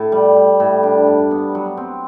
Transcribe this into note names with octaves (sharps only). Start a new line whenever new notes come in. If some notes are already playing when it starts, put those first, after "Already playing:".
Already playing: A2
G3
G3
A2
D4
G2
B3
F#3
C4